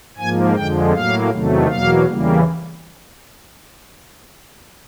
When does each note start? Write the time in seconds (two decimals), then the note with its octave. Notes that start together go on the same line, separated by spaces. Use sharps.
0.18 G#2 F3 A#3 G#5
0.55 F2 D3 F3 G#3 G5
0.93 A2 F#3 A#3 F5
1.30 E2 C3 D#3 F#3 A3
1.68 E2 B2 F#3 A#3 F5
2.06 E2 C#3 E3 G3 A#3